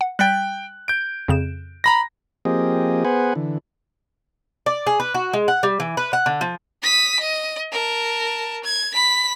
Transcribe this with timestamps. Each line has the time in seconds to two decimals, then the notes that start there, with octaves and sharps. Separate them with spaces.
0.01 F#5
0.19 G3 G5 F#6 A6 B6
0.88 G6 D7
1.28 F2 C#3 E7
1.84 A#5 B5 A#6
2.45 F3 A#3 C4 G4 G#4 D#5
3.05 B3 G#4 B4 C5 F#5 G#5
3.35 D3 E3
4.66 D5
4.87 G#4
5.00 B4
5.14 F#4
5.33 G#3
5.48 F#5
5.63 G3
5.80 E3
5.97 B4
6.13 F#5
6.26 D3
6.41 F3
6.82 D#6 B6
7.20 D#5
7.72 A#4 A5
8.64 G#6
8.94 B5 B6